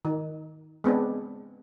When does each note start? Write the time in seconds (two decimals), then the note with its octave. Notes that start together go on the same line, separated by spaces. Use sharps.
0.05 D#3
0.84 G#3 B3 C4 D4